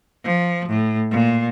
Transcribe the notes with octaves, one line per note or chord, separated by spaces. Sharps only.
F3
A2
A#2